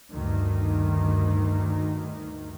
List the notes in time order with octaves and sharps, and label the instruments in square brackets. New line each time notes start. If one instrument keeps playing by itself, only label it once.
[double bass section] D2 G2 D#3